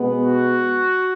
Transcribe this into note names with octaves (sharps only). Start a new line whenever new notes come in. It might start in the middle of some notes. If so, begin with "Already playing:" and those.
Already playing: B2 G#3 B3
F#4